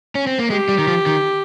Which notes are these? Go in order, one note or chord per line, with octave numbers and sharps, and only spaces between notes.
C#4
C4
A#3
G#3 G4
G3
D#3
F3
D#3